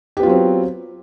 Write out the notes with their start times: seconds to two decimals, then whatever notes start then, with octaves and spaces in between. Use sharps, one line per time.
0.17 G4
0.20 B3
0.23 F4
0.26 F#3
0.29 C4